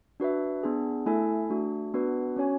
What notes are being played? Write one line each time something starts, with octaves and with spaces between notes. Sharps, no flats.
D4 F#4 B4 E5
B3 D4 G#4
A3 E4 A4 E5 G#5
A3 D4 F#4
B3 D4 F#4 B4
C#4 F#4 C#5 G#5